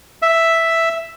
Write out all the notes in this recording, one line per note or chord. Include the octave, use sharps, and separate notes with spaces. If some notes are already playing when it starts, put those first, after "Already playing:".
E5